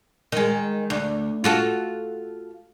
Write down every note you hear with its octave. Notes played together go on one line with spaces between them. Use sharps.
D#3 G#3
D2
F4 F#4 A4